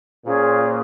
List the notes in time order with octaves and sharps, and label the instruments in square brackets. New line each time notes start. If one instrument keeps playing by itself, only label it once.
[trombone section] A#2 [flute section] C#4 F4 G#4 C5